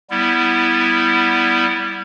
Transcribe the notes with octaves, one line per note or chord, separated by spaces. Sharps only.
G3 B3 E4